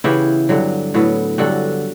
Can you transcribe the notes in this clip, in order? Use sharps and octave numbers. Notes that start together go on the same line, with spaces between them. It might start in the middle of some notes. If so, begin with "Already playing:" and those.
C#3 E3 B3 E4 G4
G2 D3 F#3
A2 F#3 B3
G2 D3 F#3 F#4 A4